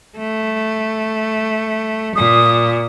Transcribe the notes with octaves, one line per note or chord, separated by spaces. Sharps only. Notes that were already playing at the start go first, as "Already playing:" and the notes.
A3
A#2 D#6